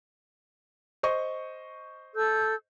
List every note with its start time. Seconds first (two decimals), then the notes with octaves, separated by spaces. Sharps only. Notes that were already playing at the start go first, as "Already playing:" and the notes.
1.03 C5 D#5 C#6
2.14 A4 E6 G6